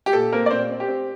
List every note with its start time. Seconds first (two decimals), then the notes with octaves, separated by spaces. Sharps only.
0.06 G4
0.13 A#2 A4
0.33 A#3 C4 A#4
0.46 D5
0.50 A#2 C4 C5
0.70 C4
0.80 G4
0.88 C4